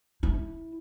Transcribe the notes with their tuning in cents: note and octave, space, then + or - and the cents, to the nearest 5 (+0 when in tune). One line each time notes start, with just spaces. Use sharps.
E4 -10